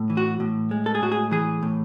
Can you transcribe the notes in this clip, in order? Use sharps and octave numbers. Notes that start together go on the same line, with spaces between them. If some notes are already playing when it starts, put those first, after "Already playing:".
Already playing: A2
E3
F#4
A2
G#3
A4
G#4
A2 F#4
G#4
E3 G#4
A2